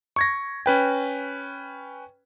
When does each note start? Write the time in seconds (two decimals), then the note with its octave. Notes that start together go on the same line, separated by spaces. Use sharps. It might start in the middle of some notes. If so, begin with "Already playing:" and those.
0.16 C#6 G#6 A#6
0.66 C#4 B4 G5